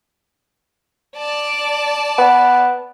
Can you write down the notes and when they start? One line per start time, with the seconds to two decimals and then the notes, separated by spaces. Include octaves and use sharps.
1.17 D5 A5
2.18 B3